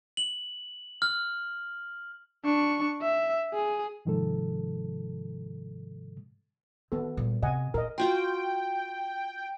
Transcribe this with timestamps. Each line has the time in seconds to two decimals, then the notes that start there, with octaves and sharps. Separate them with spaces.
0.17 F#7
1.02 F6
2.45 D4 C#6
3.02 E5
3.54 G#4
4.05 G#2 C3 D#3 F3 G#3 A4
6.92 D#3 B3 A4
7.17 A#2 G3
7.43 C3 D#5 F#5 G#5
7.74 A#2 A#4 D#5
7.98 F4 F#4 G5 C6